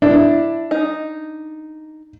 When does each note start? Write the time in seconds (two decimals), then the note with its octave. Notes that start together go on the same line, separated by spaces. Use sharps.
0.02 D4 E4
0.71 D#4